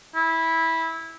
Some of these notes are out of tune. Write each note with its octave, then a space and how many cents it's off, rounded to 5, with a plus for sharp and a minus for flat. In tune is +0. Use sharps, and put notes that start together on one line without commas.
E4 -15